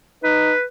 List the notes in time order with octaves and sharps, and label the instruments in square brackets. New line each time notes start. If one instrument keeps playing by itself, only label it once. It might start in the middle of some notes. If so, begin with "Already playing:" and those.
[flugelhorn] D#4 [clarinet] B4